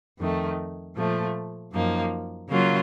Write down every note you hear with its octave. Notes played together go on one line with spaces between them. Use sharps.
F2 D#3 A3
A#2 F3 A3
F#2 F3 A#3 D#4
C#3 F#3 A#3 F4